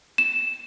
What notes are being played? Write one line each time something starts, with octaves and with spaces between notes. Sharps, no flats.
E7